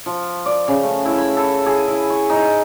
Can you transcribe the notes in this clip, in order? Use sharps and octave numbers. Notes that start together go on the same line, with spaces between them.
F3
D5
C#3
A3
E4
B5
A4
G#4
E4
C#6
D#4